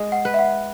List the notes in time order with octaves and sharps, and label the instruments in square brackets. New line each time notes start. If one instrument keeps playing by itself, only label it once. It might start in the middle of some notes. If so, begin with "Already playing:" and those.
Already playing: [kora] G#3
[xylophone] F#5
[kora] B4
[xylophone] E5
F#5